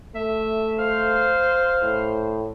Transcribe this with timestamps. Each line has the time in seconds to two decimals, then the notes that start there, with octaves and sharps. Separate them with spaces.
0.15 A3 E5
0.79 C5 F5
1.82 A2